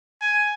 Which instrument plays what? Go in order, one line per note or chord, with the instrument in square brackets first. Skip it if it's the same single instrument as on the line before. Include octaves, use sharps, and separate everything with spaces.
[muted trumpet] G#5